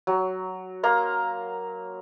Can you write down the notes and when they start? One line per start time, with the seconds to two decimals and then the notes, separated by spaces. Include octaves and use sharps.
0.07 F#3
0.83 A#3 A#5 C6